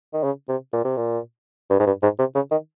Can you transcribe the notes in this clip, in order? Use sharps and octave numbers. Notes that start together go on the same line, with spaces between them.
D#3
C#3
C3
A#2
C3
A#2
G2
G#2
G2
G#2
C3
C#3
D#3